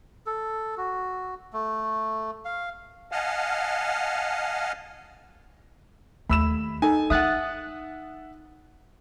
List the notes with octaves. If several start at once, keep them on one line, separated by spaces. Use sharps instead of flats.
A4
F#4
A3
F5
D#5 F5 F#5 G#5 A5 F6
D#2 A3 B5 E6 E7
D#4 A4 G#5
D#4 E5 F#5 D#6 F#6 A6